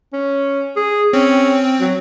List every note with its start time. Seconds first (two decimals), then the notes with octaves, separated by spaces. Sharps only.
0.13 C#4
0.76 G#4
1.13 C4 C#4
1.80 F#3